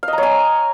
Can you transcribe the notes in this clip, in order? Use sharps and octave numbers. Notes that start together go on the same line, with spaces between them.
F5
D#5
A#5
C#5
G#5